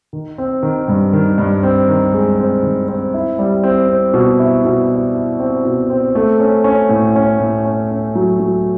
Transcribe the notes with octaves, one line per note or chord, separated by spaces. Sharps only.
D#3
C4
D#3
G2
D#3
G2
C4
D#3
G#3
C4
D#3
C4
E4
G3
C4
C4
B2
E4
B2
E4
E4
C4
B2
C4
A3
C#4
C#4
A2
C#4
A2
C#4
C#4
F#3
F#3